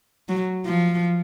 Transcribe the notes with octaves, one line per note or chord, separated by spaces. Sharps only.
F#3
F3